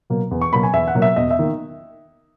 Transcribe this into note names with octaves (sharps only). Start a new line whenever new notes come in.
B2 F#3 A#3
E2
C#6
B2 F#3 A#3 B5
G#5
E2 E5
F#5
B2 F#3 A#3
E5
E1 D#5
E5
D#3 A#3